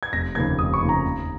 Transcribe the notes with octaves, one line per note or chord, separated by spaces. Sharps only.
G#6
F1 A#6
D#2 C#3 F3 A#3 G#6
F1 D#6
C#6
D#2 C#3 F3 A#3
A#5
D#2